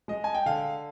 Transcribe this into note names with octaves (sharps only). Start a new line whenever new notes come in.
G#3 D#5
G#5
G5
D3 F5